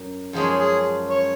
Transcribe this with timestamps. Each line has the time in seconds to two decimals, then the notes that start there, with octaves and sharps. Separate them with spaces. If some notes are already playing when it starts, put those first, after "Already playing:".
Already playing: F#2
0.33 F#2 F3 G#3 C#4 G#4
0.60 G#4
1.10 C#5